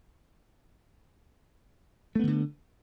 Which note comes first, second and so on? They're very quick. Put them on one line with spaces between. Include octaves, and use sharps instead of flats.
A3 B3 E3 D3